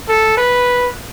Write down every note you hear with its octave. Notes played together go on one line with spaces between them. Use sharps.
A4
B4